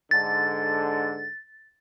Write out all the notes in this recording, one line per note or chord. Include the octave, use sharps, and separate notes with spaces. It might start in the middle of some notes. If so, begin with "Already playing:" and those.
G#2 D3 A6